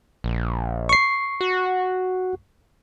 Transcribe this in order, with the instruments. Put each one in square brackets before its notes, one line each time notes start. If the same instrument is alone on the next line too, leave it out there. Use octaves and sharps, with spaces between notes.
[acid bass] A#1
[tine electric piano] C#6 C7
[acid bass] F#4